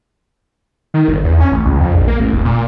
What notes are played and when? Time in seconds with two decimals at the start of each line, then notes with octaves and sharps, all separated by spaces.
0.94 D#3
1.08 G1
1.24 E2
1.40 C#4
1.52 A1
1.65 C#2
1.80 F2
1.94 A#1
2.08 A#3
2.20 A1
2.32 E1
2.45 A#2